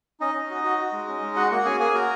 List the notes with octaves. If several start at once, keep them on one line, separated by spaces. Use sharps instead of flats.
C#4 D#4 D#5
C#4
F#4
F#4
F#4
G#3
C#4
G#3
F#4 F#5
A#3 F#4 F#5
C#4 G#4 G#5
A#3 G#4 G#5
F#4 A#4 A#5